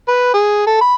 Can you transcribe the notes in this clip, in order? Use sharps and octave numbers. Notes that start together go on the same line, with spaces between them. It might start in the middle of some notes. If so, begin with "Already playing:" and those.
B4
G#4
A4
B5